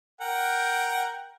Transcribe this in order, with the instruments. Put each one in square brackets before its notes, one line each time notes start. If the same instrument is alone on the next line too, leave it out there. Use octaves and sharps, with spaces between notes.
[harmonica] A#4 F#5 G5